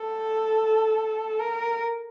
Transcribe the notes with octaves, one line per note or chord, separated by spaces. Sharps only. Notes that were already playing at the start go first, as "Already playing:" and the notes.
Already playing: A4
A#4